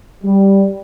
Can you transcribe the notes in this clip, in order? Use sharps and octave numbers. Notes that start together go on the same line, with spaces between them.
G3